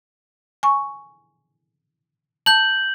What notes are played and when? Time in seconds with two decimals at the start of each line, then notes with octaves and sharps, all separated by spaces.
0.63 G#5 C#6
2.46 A5 G6 F#7